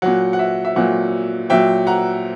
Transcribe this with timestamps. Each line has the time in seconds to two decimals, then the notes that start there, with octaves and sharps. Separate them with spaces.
0.02 A#2 F#3 F#5
0.33 F#5
0.39 E5
0.65 E5
0.76 A#2 F#3 F#5
1.50 A#2 F#3 E5 G5
1.87 F#5 A#5